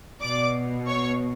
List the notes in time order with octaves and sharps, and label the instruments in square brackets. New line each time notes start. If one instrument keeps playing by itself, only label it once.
[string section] B2 D5 D6
C#5 C#6